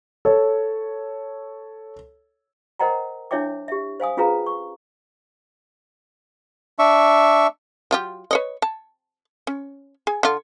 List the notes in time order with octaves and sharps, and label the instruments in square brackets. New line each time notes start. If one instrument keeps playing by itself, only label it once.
[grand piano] A4 C#5
[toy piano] A#4 C5 D#5 F#5 G5 A#5
D4 E4 C#5 E5 G5 D6
G4 E5
C5 F5 G#5 D#6
C#4 F4 G#4 B4 F5 A#5
C#6
[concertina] D4 E5 C#6
[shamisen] F#3 F4 G4
B4 C#5 D#5
A5
C#4
G#4 G#5
D3 F4